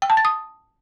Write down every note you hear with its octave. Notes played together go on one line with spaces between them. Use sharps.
G5
A5
A6
D#6